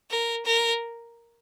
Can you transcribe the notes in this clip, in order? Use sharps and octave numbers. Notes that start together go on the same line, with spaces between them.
A#4
A#4